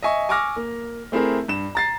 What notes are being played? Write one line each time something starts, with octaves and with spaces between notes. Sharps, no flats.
D#5 E5 G#5 C#6
G#5 C#6 D6 E6 F6 A#6
A#3
A3 C4 E4 G#4 A#4
G2 E7
A#5 A6 C7